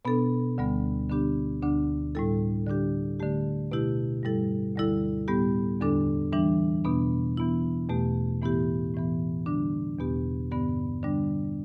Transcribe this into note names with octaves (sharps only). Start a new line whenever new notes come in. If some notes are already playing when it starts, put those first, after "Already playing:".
B2 B3 D4 A4
D2 D3 G3 B3
D3 B3 D4 G4
D2 D3 B3 D4
A2 G3 E4 A4
D3 G3 D4 G4
D3 A3 G4
B2 A3 E4 G4
G2 G3 E4 A4
D2 D3 G3 E4 A4
A2 G3 B3 G4
E2 D3 G3 D4 A4
E3 G3 D4
E2 B2 B3 D4
E3 B3 E4
E2 B2 A3 G4
A2 E3 B3 E4 G4
A2 E3 B3
D3 G3 D4
E2 B2 B3 G4
G2 D3 B3 G4
D3 G3 D4